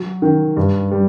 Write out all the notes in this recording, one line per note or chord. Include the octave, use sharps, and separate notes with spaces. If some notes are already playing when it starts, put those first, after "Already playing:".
Already playing: F#3
D#3
G2
G3